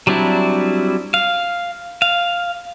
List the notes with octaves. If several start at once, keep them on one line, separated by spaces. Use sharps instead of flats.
F#3 G3 C4 D4 E4
F5
F5